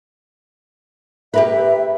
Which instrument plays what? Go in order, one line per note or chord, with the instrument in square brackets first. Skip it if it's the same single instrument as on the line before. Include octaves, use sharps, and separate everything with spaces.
[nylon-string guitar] G4 A#4 B4 [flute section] E5